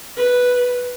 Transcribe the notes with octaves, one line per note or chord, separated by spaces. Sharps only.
B4